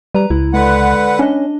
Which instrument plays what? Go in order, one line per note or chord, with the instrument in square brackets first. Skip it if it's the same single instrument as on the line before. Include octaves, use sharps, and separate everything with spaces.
[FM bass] G3 [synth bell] B4 A#5
[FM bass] C#2 [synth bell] E4
[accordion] D3 B4 F#5 [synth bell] G#3
[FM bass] C#4 [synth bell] D4 D#5